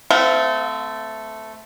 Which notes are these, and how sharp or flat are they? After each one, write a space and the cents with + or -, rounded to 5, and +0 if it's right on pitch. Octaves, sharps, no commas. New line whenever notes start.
A3 +0 C4 -30 F5 +20